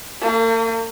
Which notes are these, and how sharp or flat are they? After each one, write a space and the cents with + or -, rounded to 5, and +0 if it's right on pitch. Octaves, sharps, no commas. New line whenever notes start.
A#3 -45